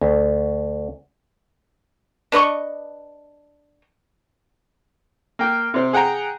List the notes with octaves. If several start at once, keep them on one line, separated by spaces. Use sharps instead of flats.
D2
D4 B4 D#5 C#6
A#3 G5
C3 C4
G#4 F#5 G5 A#5